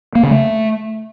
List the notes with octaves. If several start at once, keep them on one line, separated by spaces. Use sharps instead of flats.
A#3
C#3
A3